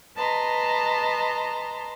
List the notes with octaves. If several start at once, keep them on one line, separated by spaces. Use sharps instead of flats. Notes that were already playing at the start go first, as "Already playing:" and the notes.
B4 D#5 A5 A#5 C6